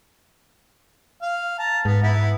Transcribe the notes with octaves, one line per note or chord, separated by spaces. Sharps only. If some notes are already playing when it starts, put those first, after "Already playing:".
F5
A5 A#5
G#2 B3
B3 E4 B4